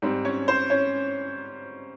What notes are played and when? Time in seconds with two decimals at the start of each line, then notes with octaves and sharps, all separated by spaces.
0.02 G#2 G3 C4
0.25 C#4 C#5
0.48 C5
0.70 C#4 C#5